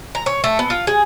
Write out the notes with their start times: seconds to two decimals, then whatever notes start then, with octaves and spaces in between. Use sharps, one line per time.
0.15 A#5
0.26 C#5
0.44 A3
0.59 B3
0.70 F4
0.87 G#4